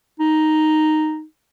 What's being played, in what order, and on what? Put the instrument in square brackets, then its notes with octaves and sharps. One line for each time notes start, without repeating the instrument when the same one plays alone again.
[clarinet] D#4